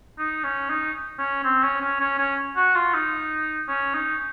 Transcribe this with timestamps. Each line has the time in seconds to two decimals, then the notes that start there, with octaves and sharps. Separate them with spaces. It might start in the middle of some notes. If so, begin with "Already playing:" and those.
0.19 D#4
0.44 C#4
0.69 D#4
1.19 C#4
1.44 C4
1.63 C#4
1.81 C#4
2.00 C#4
2.19 C#4
2.57 F#4
2.76 F4
2.94 D#4
3.69 C#4
3.94 D#4